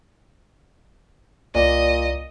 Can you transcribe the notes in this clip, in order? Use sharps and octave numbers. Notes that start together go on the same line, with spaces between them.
C2 A#2 D5 D#5